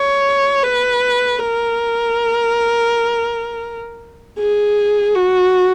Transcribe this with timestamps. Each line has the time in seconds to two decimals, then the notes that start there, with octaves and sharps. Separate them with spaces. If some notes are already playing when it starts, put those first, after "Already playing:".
Already playing: C#5
0.63 B4
1.38 A#4
4.39 G#4
5.14 F#4